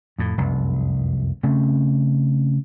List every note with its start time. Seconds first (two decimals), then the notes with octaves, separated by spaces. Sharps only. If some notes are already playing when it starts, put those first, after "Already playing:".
0.18 F2 A2
0.38 F1 C2 F#2
1.43 C#3 A3 C4 C#4